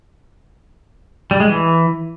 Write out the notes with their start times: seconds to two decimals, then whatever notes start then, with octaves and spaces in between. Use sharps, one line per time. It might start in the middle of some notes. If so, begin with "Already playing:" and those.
1.31 G3
1.40 G#3
1.49 E3